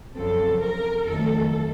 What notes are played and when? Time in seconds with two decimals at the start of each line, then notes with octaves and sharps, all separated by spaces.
0.14 F#2 C#3 F3 C4 A4
0.60 A#4
1.05 F2 D#3 F#3 A3 A4